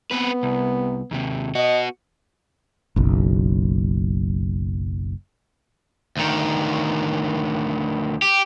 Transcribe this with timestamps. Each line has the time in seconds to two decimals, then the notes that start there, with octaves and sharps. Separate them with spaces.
0.11 B3 C4 B4
0.43 C2
1.11 D#2 C3
1.55 B3 F#4 D#5
2.96 F#1 B1
6.17 D2 D#3
8.22 G4